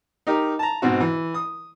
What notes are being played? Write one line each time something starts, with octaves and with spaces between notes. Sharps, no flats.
D#4 G4 A#4
A5 A#5
G#2 B2 C4 F#4
E3
D#6